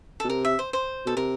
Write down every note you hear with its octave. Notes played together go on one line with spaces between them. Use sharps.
B2 A4
C3 A#4
E5
C5
C5
B2 A4
C3 A#4